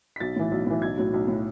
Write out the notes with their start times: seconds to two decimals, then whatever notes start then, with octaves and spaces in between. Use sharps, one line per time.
0.16 B6
0.20 B1 A6
0.36 A2 E3
0.52 B1
0.67 A2 E3
0.82 B1 G#6
0.98 A2 F#3
1.14 B1
1.28 A2 F#3